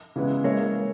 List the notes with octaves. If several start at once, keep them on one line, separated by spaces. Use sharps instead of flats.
C#3 E3 G#3 B3 E4
G#3 A#3 C#5 E5